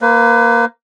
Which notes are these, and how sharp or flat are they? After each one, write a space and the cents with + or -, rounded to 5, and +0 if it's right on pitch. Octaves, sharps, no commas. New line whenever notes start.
A#3 +0 B4 +30